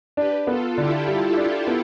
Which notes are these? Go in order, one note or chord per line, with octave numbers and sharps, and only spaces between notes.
D4 G4 B4
B3 F4 A4
D3 E4 G4
G3
D4
B3